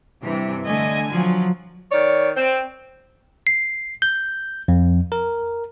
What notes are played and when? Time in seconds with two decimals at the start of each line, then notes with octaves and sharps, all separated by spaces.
0.23 G2 C3 E3
0.65 D3 A3 D#5 G#5
1.11 F3 F#3
1.91 D#3 C#5 D5
2.36 C4
3.47 C7
4.02 G6
4.68 F2
5.12 A#4